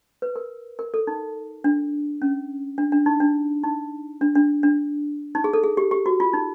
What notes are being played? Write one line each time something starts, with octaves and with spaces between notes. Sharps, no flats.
B4
A#4
A#4
A4
D#4
D4
C#4
D4
D4
D#4
D4
D#4
D4
D4
D4
D#4
G#4
A4
G#4
G4
G4
F#4
F4
D#4